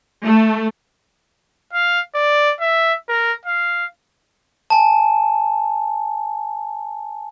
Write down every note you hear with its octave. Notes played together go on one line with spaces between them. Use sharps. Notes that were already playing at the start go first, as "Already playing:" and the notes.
A3
F5
D5
E5
A#4
F5
G#5 A5